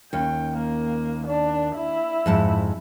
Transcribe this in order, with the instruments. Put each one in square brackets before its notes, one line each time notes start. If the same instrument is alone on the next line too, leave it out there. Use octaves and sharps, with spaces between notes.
[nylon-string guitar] D#2 C#4 [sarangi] G5
[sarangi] A#3
D4
E4
[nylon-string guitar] F2 G#2 A5